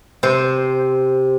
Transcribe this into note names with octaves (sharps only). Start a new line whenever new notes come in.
C3 C5